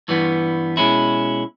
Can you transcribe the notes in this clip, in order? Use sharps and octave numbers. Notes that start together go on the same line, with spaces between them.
G2 E3 G3 B3
B2 G#3 C#4 E4